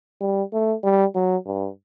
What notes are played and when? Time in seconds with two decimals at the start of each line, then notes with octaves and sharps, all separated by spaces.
0.21 G3
0.53 A3
0.84 G3
1.15 F#3
1.46 G2